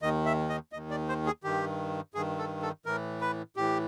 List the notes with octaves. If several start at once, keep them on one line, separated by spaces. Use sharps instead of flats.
D#2 D#3 D#5
E5
D#5
D#2 D#3 D#5
D5
C5
G#4
G2 D#3 G4
G2 D#3 G#4
A4
A4
A2 E3 A#4
B4
A2 E3 G4